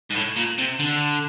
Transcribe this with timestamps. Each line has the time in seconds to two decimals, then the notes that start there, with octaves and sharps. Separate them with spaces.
0.10 G#2
0.15 A2
0.36 A#2
0.58 C3
0.79 D3